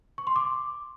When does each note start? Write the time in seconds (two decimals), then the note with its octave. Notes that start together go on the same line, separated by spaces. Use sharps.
0.18 C#6
0.27 C6
0.36 D6